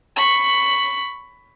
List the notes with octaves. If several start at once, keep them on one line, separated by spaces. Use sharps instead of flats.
B5 C#6